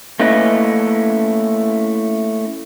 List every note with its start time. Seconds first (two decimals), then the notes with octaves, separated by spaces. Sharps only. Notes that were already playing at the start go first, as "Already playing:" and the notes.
0.20 A3 A#3 C#4 E4 B4 D#5